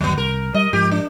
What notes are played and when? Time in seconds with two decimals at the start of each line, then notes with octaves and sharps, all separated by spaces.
0.01 G1 D#2 F#3 B3
0.18 C2 A#4
0.54 G3 D#5
0.73 G#2 F3 G4
0.91 D4